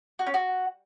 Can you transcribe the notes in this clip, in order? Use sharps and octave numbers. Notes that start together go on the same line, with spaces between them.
F#4
C#4
F#4